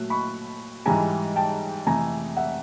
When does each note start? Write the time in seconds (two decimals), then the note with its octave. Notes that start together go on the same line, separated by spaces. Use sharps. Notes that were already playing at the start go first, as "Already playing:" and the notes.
Already playing: A#2 F#3 A3 F#6
0.10 B5 C#6
0.86 G#2 E3 G3 G#5 A#5
1.36 G5 A5
1.86 F2 C3 E3 A3 G#5 A#5
2.37 E5 F#5